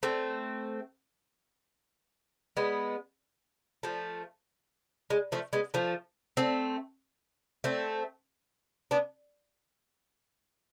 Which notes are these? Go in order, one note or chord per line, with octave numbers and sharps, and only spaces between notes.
A3 C4
G#3 B3
F3 A3
G#3
F3 A3
G#3 B3
F3 A3
A3 C4
A3 C4
B3 D4